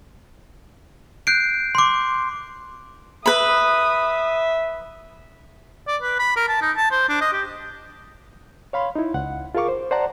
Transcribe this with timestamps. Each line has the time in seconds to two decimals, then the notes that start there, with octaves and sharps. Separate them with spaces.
1.27 F#6 G6 C7 D7
1.75 C6 D6
3.26 B4 E5 B5 D#6
5.88 D5
6.02 B4
6.19 B5
6.36 A#4
6.48 A5
6.61 D#4
6.77 A5
6.91 C5
7.09 D4
7.21 D#5
7.33 G4
8.73 C#5 F5 B5 C6
8.96 D#4 E4
9.14 C#2 F#5
9.55 F4 G#4 A#4 F5 C#6 D6
9.68 C5
9.91 C5 D5 F#5 A5 A#5